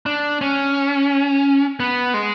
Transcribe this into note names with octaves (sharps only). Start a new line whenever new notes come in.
D4
C#4
B3
G#3